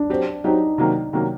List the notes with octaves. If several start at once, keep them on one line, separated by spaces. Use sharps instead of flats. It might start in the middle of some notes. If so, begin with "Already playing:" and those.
Already playing: D4
F#3 C4 G4
F#3 C4 D#4 G4
C3 D#3 F#3 A#3
C3 D#3 F#3 A#3